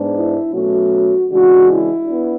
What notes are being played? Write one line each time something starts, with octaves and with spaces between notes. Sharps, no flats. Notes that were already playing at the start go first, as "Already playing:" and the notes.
Already playing: G#2 G#3 B3 D4
E4
B2 F#3 A3 C#4 F#4
C#3 E3 G#3 D4 F#4
E4
B3 D4